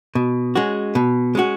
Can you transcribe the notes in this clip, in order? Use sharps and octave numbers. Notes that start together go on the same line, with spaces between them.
B2
G#3 C#4 F#4
B2
G#3 C#4 F#4